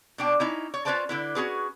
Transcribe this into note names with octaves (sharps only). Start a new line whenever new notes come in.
B2 D4 G5
C#4 D#4 E4
C#5
C#4 F4 B4 C5 D5 A5
D3 E4 B4
C#4 F#4 G#4 B4